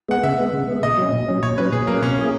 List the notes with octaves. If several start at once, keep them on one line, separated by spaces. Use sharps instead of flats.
G#3 B3 F#5
C#3 E5
G#3 B3
C#3
G#3 B3
A#2 D#5
F#3 C#4
A#2
F#3 C#4
A#2 C#5
F#3 C#4 B4
A#2 G#4
F#3 A#3 C#4
B2 C#4
A#3 E4 G#4